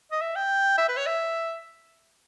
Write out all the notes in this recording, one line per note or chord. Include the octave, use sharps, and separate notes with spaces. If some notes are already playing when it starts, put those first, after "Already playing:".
D#5
E5
G5
E5
B4
C#5
E5